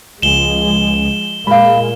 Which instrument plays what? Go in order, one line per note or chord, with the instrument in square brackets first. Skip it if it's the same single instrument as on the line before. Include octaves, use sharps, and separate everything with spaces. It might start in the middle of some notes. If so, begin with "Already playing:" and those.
[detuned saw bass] C#2 [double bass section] F3 G#3 [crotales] E7 G7
[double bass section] A#2 A#3 [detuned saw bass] G#3 [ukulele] F5 B5